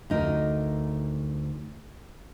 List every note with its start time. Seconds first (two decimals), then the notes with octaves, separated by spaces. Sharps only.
0.10 D2 D#4 A#4